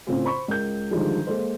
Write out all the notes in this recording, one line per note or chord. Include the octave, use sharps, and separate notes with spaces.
A2 C#3 C4 F4 G#4
C5 B5 C#6
C#2 A#4 G6
D3 D#3 F3 G3 G#3
G#3 A#3 A4 C5